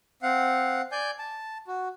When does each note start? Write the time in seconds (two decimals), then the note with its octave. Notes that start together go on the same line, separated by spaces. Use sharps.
0.22 C4 F5 F#5
0.92 D5 G#5 G6
1.19 A5
1.67 F#4